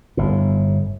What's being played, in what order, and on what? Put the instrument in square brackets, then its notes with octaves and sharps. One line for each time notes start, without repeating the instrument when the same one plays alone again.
[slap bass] G1 A2